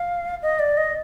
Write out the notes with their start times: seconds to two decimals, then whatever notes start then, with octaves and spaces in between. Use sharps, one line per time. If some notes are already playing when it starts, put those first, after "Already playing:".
Already playing: F5
0.42 D#5
0.59 D5
0.77 D#5